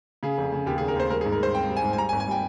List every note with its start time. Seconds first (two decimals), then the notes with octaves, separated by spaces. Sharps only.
0.23 C#3 G#4
0.38 F1
0.52 C#3
0.66 D#2 G4
0.78 G#4
0.81 F1
0.88 A#4
0.96 D#2 C5
1.10 G3 A#4
1.21 G#4
1.25 G#2
1.32 A#4
1.40 G3 C5
1.55 C4 G5
1.68 G3
1.77 G#5
1.83 G#2
1.93 G#5
1.98 G3 A#5
2.09 G#5
2.12 G#1
2.20 G#5
2.28 G3 G5